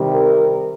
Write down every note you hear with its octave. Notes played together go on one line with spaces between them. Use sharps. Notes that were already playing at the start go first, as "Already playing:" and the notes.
Already playing: C3 D#3 G3
A#4